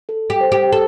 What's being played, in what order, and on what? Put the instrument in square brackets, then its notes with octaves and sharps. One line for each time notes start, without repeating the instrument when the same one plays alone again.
[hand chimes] A4
[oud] G4
[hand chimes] C5
[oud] G4
[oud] A4 [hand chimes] C5